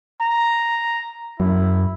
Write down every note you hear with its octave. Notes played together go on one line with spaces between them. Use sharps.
A#5
F#2 E4